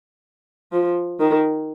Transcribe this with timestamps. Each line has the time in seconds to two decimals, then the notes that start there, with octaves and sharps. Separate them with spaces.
0.72 F3
1.20 D#3